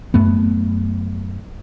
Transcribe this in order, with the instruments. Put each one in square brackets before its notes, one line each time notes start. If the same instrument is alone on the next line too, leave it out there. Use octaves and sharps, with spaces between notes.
[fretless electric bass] F#2 A3 B3